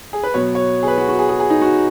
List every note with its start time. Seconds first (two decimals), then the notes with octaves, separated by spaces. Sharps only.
0.13 G#4
0.23 B4
0.34 B2 F#3 B3 C#5
0.55 C#5
0.83 G#4
0.88 B4
0.98 F#4
1.08 F#4
1.19 G#4
1.29 G#4
1.40 G#4
1.50 D#4
1.62 F#4